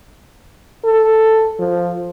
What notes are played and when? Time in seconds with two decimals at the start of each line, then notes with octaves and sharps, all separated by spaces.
0.85 A4
1.59 F3